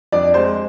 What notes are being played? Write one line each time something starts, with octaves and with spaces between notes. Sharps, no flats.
F2 D4 D5
G#3 C5